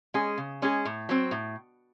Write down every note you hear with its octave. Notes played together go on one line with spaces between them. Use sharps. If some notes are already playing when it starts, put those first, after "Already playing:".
G#3 C#4 G#4
C#3
G#3 C#4 G#4
A2
F#3 C4
A2